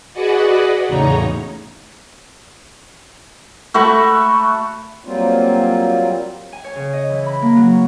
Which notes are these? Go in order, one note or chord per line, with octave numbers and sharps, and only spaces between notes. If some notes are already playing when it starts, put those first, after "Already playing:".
F#4 G#4 B4 D5 D#5 F#5
E2 A2 C#3 D#4 C#5 A#5
A3 F#4 B5 C#6
F#3 G3 A#3 C4 F4
G#5
C#5
C#3
D#5
E3
B5
A#3
F#3
C#6